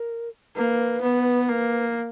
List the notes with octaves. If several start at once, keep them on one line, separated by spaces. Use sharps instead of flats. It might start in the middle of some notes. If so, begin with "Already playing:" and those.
Already playing: A#4
A#3 B4
B3
A#3